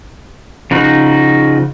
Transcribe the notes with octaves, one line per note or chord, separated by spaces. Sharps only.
C#3 F3 D#4 F#4